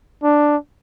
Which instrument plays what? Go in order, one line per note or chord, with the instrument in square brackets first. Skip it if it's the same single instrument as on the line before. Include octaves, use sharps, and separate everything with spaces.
[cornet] D4